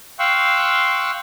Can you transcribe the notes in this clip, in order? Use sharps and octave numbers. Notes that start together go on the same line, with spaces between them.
F5 G5 C6 C#6 E6 F#6